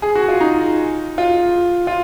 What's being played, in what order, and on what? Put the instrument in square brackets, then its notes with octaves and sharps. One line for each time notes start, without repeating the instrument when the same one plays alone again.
[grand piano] G#4
F#4
F4
D#4
F4
F4